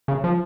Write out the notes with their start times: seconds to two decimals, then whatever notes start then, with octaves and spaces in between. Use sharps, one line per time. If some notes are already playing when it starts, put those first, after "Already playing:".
0.08 C#3
0.24 F3